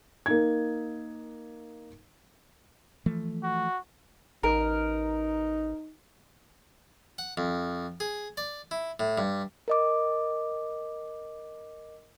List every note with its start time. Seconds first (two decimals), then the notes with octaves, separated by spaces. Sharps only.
0.26 A#3 D#4 G#6
3.06 E3 F3 A3
3.43 F#4
4.43 A1 D#4 A#4
7.18 F#5
7.37 F2
8.00 G#4
8.37 D5
8.71 E4
9.00 A2
9.18 G2
9.68 A#4 D#5 D6